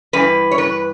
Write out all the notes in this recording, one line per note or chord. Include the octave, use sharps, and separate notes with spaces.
G2 E3 B4
C#5
B4